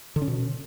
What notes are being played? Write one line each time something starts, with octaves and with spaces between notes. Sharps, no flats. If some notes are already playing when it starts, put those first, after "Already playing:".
D3
C#4
B2